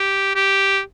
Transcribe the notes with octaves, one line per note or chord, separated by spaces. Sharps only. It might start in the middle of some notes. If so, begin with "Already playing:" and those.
Already playing: G4
G4